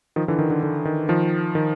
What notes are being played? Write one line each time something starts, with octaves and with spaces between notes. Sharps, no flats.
D#3 F3
D3 E3
D#3
D3
D3
D#3
D#3 F3
D#3